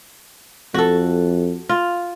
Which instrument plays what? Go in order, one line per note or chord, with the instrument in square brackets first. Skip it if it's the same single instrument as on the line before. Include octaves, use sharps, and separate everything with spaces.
[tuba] F2 [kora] F#4 A4
[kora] F4